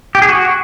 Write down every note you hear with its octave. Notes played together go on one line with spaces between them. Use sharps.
G4
G#4
F#4